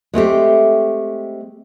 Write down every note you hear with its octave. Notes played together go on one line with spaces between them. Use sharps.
G#3 A3 C4 G4